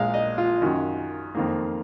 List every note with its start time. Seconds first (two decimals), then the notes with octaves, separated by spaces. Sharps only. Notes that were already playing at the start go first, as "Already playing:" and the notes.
Already playing: A#1 A#2 G#3 F5
0.14 D#5
0.38 F4
0.61 F#2 D#3 F#3
1.35 F2 D#3 A#3